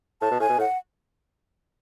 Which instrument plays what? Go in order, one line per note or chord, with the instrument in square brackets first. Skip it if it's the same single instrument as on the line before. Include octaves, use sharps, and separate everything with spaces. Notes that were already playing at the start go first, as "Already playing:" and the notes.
[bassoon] A2 [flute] A5
[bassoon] B2
[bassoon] A2 [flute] G#5
[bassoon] B2
A2
[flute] F#5